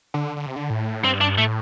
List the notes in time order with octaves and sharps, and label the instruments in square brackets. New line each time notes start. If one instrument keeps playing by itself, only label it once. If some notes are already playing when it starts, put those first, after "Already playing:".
[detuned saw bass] D3
D3
C3
D3
A2
[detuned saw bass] G2 [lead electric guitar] C4
[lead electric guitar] D4
[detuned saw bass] A2 [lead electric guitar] A3